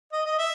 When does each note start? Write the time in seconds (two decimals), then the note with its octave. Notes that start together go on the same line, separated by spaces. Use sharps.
0.13 D#5
0.26 D#5
0.39 E5